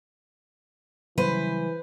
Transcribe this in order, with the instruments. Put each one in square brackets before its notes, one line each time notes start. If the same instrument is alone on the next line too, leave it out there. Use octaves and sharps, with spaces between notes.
[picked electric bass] C#3 F#3 G3 [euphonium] E3 [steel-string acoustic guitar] B4 C5